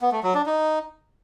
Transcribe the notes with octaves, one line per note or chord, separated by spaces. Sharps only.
B3
A3
F#3
D4
D#4